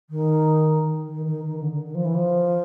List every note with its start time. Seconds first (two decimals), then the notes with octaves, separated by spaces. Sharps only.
0.10 D#3
1.08 D#3
1.27 D#3
1.46 D#3
1.60 D3
1.72 D3
1.85 D#3
1.95 F3
2.05 E3
2.14 F3